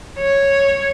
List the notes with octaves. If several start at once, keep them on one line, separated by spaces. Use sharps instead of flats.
C#5